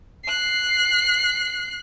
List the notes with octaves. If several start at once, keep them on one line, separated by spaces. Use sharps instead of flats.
F#6 C7